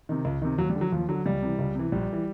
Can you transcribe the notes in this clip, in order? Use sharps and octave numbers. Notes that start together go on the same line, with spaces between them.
C3 D#3
C#2
C3 D#3
D#2 F#3
G3
D3
F#3
D#2 F3
D3 F#3
C#2 G3
C3 E3
C#2
C3 E3
A#1 G3
E3